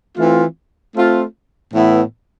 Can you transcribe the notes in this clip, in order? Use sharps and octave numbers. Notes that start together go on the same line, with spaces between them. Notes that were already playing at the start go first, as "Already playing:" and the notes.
E3 A3 C4 F4
A3 C4 F4
A2 E3 B3 E4